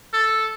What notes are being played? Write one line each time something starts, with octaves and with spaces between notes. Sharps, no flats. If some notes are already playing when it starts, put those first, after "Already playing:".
A4